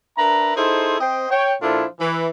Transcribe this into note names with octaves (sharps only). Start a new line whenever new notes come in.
D4 A#4 B4 E5 A#5
D#4 E4 G#4 A4 C5 C6
C4 C5 D#5 G5
C#5 G5
A#2 F3 D4 E4 F4 A4
E3